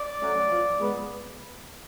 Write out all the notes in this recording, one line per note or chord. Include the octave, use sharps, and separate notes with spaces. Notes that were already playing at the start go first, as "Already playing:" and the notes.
Already playing: D5
F#3 A3 C#4
F3
G#3 B3